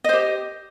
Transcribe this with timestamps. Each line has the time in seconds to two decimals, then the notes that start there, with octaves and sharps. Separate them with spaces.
0.04 D#5
0.09 C5
0.13 G4